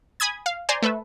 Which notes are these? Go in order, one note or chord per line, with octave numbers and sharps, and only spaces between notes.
G#5 B5 D#6 G#6
F5
C5 D5 G#5 A#5 C6
A3 A4 B4 E5